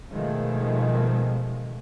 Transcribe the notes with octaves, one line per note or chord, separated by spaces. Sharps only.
B2 D#3 F3 G#3 A3